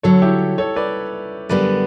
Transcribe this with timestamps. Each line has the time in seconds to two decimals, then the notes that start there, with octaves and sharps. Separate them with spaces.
0.03 D2 D3 F#3 A4 C#5
0.22 E4 G4
0.58 A4 C#5
0.76 B4 D5
1.49 F#2 D3 G3 B3 B4 D5